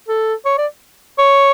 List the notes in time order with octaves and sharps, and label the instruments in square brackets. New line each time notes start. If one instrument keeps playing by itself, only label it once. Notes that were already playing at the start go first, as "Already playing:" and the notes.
[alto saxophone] A4
C#5
D5
C#5